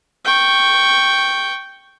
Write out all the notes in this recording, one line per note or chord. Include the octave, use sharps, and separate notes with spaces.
G5 C#6